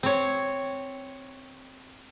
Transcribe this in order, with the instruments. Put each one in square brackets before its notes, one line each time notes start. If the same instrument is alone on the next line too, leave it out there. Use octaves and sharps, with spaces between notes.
[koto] C4 C#5